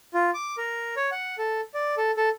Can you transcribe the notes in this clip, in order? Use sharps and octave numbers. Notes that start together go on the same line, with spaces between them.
F4
D6
A#4
C#5
F#5
A4
D5
A4
A4